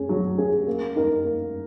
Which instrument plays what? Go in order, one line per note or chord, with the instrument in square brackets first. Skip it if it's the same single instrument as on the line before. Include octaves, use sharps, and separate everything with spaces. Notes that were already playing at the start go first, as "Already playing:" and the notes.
Already playing: [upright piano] C#4 G#4
F#3
C#4 G#4
A#3
D#4 A#4
A#3